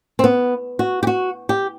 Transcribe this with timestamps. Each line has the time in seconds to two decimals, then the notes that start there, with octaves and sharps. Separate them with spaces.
0.19 C4
0.24 B3
0.79 F#4
1.03 G4
1.07 F#4
1.49 G4